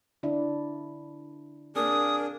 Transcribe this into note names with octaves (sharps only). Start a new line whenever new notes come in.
D3 D4 E4
A#3 C4 D4 G#4 A#4 D#6